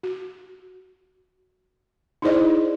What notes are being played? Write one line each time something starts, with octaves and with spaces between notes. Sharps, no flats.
F#4
D#4 E4 G#4 C5 D5 D#5